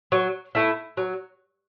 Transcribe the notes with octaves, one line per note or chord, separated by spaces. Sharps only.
F#3
A3 E4
F#3